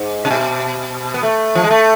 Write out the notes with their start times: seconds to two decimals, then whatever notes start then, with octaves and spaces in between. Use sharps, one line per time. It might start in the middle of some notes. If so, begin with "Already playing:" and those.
Already playing: G#2
0.25 C3
0.31 B2
1.14 B3
1.23 A3
1.55 F3
1.63 G#3
1.70 A3